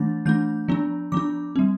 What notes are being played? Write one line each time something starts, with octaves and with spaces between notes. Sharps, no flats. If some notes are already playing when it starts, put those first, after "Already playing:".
Already playing: E3 A3 D4 A6
E3 A3 D4 G6
F3 B3 D4
F3 B3 D4 D6
G3 C4